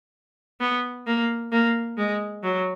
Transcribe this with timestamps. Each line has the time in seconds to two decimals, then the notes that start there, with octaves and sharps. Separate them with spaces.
0.61 B3
1.07 A#3
1.52 A#3
1.98 G#3
2.44 F#3